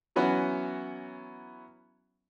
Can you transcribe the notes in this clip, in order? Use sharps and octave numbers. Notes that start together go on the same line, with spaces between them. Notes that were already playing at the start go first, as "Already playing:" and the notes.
E3 F#3 B3 C#4 E4 F#4